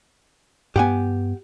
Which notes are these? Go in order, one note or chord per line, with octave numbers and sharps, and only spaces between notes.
G2 B3 G4 F#5 G#5